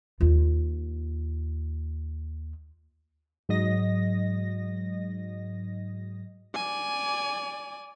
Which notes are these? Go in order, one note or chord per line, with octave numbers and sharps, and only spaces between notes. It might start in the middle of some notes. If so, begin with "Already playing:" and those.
D#2 F4
G#2 F#3 D#5 A#6
D5 G#5